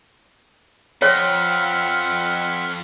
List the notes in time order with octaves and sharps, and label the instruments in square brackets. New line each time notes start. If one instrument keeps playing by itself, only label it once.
[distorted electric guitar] F2 [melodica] C4 F#5 B5 [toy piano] C#5 [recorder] F6